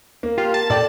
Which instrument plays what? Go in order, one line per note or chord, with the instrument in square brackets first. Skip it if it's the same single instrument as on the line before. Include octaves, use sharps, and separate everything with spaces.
[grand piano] A#3
[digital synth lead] F4 [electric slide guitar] G4
[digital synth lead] A5
[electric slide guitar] A#2 G5 [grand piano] A4 D5